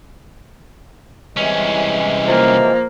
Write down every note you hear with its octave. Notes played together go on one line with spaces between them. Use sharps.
C2 C3 E3 G#3 C#4
F3 A#3